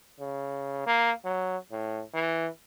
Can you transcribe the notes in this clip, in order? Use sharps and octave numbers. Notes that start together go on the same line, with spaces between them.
C#3
A#3
F#3
A2
E3